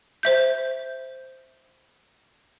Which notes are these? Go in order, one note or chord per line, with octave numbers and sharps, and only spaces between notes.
C5 E5 G6